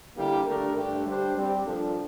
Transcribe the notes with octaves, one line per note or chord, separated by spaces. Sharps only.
D3 G3 A#3 E4 G4
D3 A3 D4 G4 A#4
G2 D3 A3 D4 G4
G3 D4 G4 C5
G3 C4 G4
A#2 F3 A#3 D4 A4